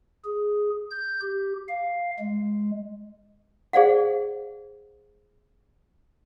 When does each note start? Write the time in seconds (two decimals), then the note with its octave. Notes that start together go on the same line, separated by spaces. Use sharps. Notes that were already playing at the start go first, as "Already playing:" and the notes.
0.25 G#4
0.91 G6
1.21 G4
1.69 F5
2.19 G#3
3.73 G#4 C5 D5 F5 F#5